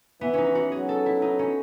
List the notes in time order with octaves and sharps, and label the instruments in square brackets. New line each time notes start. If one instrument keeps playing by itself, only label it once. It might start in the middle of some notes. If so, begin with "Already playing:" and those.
[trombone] E3 [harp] B3
[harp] C#4 D#4
F#4
[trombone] F#3 [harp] G#4
[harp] A4
E4
D#4
C#4